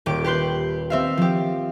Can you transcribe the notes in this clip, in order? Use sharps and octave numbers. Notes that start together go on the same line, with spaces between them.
D#1 G4 D6 D7
G4 B4 C6 G6
C4 E5 F5
F3 G4